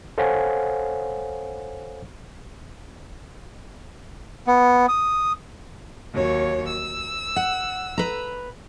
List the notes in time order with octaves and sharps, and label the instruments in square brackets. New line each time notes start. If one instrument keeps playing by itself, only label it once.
[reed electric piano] A4 C5 C#5 F5 F#5 G#5
[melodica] B3
D#6
[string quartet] D#2 F#3 C#5
E6
[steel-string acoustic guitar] F#5
B4 A#5